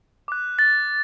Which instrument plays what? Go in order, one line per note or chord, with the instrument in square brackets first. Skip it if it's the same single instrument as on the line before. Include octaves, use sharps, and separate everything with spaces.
[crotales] D6 F#6
A6